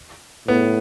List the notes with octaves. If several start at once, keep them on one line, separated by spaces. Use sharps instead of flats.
A2 B3